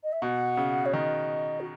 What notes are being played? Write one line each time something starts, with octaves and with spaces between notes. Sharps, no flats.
D#5
E5
B2 F#5
C#3
C#5
D#3 D#5
F#4